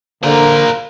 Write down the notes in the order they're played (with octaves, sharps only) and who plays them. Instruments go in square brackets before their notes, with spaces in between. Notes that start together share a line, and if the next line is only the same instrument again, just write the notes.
[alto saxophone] D3 [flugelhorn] A#3 [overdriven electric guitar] A#4 C5